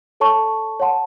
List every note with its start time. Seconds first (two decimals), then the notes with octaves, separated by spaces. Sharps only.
0.20 A4 C#5 A5 C#6
0.80 C#5 F#5 A5 C6